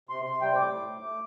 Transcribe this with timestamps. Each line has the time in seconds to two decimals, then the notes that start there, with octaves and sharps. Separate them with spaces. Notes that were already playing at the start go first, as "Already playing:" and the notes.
0.09 C3 C6
0.25 C3 C6
0.41 G3 G5
0.56 A2 D6
0.72 A2
0.88 A3
1.03 A3